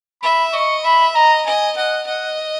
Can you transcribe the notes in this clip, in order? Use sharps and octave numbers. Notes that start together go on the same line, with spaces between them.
E5 B5
D#5 C#6
E5 B5
D#5 A#5
D#5 G#5
D#5 F#5
D#5 F#5